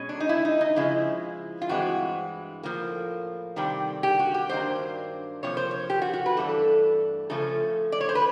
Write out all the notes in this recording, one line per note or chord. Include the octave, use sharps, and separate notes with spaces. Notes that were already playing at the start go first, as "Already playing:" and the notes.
Already playing: B2 G#3 C#4
D4
D#4
E4
D#4
D#4
C#3 F3 G#3 E4
F4
G2 E3 G#3 C4 F#4
A2 F3 A#3
C3 D#3 G3 C4
G4
F#4
G4
G2 D#3 F#3 A#3 D4 C5
C3 F3 A#3 C#5
C5
C#5
G4
F#4
F#4
B4
G2 E3 A3 D4 A4
C#3 F3 A3 C#4 A4
D5
C#5
C5
B4